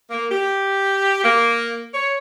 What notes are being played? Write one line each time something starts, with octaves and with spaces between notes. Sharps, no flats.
A#3
G4
A#3
C#5